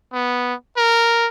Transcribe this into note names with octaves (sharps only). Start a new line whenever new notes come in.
B3
A#4